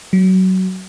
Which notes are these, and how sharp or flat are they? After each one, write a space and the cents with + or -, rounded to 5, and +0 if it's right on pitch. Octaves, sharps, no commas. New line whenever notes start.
F#3 +20